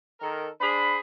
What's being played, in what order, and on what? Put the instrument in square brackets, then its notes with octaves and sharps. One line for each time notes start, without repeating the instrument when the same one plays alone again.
[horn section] D#3 A4 A#4
D4 G#4 C5 B5